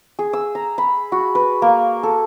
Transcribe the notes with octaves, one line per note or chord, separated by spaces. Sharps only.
G#4
E6
A#5
B5
F#4
B4
A#3
A4